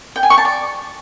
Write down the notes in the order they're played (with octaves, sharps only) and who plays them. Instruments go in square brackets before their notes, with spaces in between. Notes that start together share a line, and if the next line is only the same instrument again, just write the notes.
[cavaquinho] G5
G#5
C#6
A5
D5